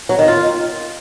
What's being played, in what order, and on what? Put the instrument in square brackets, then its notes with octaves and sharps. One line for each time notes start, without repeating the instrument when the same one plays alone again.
[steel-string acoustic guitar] F#3
D#3
F4